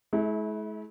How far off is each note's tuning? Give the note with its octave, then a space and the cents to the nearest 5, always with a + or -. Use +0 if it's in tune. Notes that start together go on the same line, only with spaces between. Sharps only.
G#3 +45 E4 -25